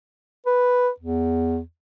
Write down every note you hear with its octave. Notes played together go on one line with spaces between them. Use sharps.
B4
E2